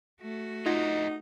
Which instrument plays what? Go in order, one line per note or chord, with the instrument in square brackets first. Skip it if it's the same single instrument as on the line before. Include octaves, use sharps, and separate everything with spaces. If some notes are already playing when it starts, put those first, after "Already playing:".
[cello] A3 F#4
[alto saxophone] D#4 [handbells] F4 G#6 A#6 [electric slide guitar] G#4 D#5 F#5